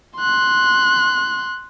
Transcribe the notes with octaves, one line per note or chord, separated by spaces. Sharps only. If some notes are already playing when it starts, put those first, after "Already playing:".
C6 F#6